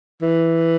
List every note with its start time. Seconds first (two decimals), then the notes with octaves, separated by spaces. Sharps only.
0.22 E3